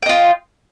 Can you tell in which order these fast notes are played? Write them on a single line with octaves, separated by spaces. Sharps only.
G5 D#5 F4